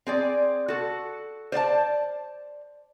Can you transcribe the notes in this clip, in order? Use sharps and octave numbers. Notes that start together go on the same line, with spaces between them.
C4 G#4 D5
F#4 A4
C5 D5 F5 A5